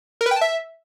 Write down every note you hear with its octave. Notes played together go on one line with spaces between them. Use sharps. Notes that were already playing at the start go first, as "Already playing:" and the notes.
A#4
B4
G5
A5
E5